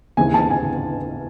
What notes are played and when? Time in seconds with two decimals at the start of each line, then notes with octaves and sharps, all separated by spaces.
0.17 D#2 C#3 E3 C4 G#5
0.34 A5
0.50 G#5